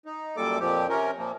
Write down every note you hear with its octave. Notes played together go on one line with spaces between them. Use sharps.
D#4
F#2 A#2 G3 A#3 A4 D6
F2 A#2 F3 G4
C3 C#4 A#4
A#2 F3 A#3